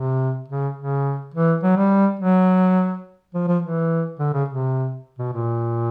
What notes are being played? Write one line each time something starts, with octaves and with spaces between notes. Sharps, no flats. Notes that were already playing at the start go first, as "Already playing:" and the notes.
Already playing: C3
C#3
C#3
E3
F#3
G3
F#3
F3
F3
E3
D3
C#3
C3
B2
A#2